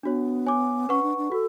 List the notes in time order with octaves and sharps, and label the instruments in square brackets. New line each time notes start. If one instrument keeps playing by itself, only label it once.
[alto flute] B3 [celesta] D4 F#4 C#5
[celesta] C#5 G#5 D6
[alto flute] C#4 [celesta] B4 F#5 C#6
[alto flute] D4
D4
[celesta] F#4 [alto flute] A4